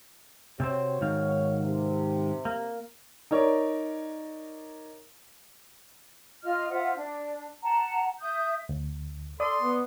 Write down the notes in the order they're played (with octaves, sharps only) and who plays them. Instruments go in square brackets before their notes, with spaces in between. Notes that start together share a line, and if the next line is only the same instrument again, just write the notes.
[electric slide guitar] C3 C4 C5 [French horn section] F#4 C#5
[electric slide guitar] G#2 D#3 F5
[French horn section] C3
[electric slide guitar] A#3
[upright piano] D#4 A#4 C#5 D5
[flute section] F4 D#5 F6
F4 C5 E5 F#5
D4
F#5 A5 A#5
E5 D#6 G6
[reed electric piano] D2
[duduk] A4 [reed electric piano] D5 D#6 [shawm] C6
[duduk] B3